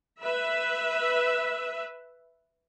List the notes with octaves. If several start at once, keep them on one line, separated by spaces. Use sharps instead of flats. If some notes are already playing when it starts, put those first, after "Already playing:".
B4 E5